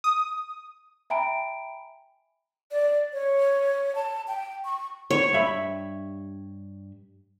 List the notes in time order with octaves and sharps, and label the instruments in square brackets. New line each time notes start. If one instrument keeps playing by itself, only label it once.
[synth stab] D#6
[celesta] E5 G5 G#5 A#5 B5 D7
[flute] D5
C#5
A5
G5
C#6
[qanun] C#5
[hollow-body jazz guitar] G2 E5 B5